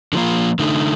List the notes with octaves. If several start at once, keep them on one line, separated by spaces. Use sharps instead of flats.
D3 F3 A#3 F4
D3 A3 D#4